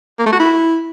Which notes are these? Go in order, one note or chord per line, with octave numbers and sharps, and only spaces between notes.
A#3
A3
F#4
E4